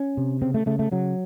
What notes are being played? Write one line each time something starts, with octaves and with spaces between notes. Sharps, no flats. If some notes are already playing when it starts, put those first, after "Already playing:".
Already playing: C#4
C3
C#3 C4
A3
C#3 A3
A3
C#3 F#3